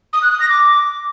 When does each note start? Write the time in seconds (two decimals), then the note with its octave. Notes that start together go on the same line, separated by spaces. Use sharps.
0.13 D#6
0.22 F#6
0.31 D#6
0.40 A#6
0.49 D6